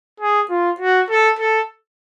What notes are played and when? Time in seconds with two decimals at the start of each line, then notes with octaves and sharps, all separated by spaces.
0.20 G#4
0.49 F4
0.80 F#4
1.10 A4
1.39 A4